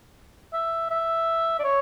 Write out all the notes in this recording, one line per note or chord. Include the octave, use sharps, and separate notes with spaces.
E5
E5
D5
C#5